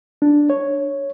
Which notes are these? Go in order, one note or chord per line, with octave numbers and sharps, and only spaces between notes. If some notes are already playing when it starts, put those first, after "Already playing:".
D4
C#5